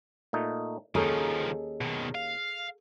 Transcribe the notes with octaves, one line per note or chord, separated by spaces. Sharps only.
A#2 A3 D#4
D#2 D#3 F3 C#4 D#4 G#4 A4
B2 D#3
F5